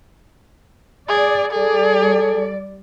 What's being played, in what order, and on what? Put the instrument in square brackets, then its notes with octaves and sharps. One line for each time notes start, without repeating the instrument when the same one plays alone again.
[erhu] G#4 [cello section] D5
[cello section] G3 D5 [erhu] G#4 [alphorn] A4